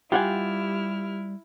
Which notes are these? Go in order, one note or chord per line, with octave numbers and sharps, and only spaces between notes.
G3 E4 F4 G4 F#5 G#5 F6